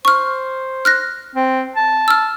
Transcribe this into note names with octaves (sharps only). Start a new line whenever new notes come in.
C5 C#6 F6
F6 F#6 A#6
C4
A5
E6 F6